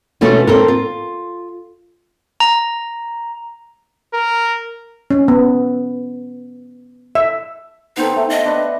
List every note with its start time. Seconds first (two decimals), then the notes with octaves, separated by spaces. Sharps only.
0.21 B2 E3 A3 C#4 F4 F#4
0.47 C4 A4 A#4
0.68 F4
2.40 A#5
4.14 A#4
5.11 C#4
5.28 B3
7.15 E5
7.97 B3 C4 D#4 A4
8.16 A3
8.30 D#5
8.45 D4 B4 C#6